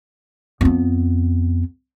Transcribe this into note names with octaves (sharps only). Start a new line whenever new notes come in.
F2 B3